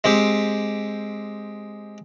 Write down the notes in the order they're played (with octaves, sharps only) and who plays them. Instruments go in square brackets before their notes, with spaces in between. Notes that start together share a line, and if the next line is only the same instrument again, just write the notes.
[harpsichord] G#3 C4 G4